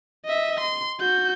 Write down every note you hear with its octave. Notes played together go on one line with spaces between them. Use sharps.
D#5 E5
C6
F#4 G6